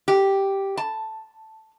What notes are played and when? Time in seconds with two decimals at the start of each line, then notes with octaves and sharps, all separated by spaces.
0.08 G4
0.77 A5